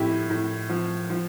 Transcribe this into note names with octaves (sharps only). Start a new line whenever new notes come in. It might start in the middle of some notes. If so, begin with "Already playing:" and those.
Already playing: A2 F3 E4 F4 G4
A2
F3
F3